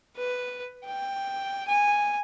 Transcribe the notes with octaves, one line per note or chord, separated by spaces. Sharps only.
B4
G5
G#5